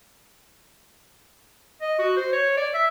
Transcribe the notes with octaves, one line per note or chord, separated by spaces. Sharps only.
D#5
F#4
C5
C#5
D5
E5